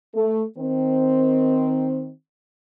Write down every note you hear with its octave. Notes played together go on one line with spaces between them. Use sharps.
A3
D#3 C4